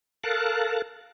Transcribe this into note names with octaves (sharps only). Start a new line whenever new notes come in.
A4 A#4 F5 A5 F#6